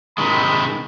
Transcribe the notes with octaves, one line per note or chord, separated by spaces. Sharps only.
C3 D#3 G#3 B5